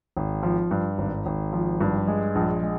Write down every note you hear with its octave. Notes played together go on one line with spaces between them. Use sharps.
G#1
F3
G2
G#1
G#1
F3
G2
G#3
A#1
G#3